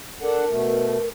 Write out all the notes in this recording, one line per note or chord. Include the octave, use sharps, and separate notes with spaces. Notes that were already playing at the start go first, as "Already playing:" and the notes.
D4 A4 A#4 F#5
B2 A3